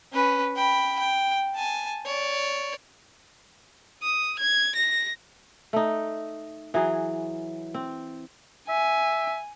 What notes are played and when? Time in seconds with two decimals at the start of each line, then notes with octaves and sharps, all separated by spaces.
0.13 C#4 B4
0.57 G5 B5
0.99 G5
1.55 G#5 A5
2.06 C#5 D5
4.03 D#6
4.39 G#6
4.75 A#6
5.73 A3 D#4
6.74 E3 F#3 G#4
7.74 C4
8.69 E5 G#5